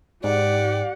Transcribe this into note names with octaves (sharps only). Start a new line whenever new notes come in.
G#2 G4 D5 F#5